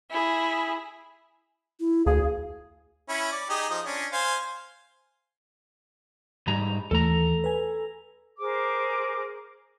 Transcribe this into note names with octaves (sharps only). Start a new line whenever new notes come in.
E4 G#4
E4
D2 G#4 F5
C#4 E4
D5
D#4 G4 G#4
F3 D#4
C#4 D4
C5 F5 G#5
G#2 G3 A#5
D#2 E3 A3 A4 A#5
B4 G#5
G#4 A#4 C5 D6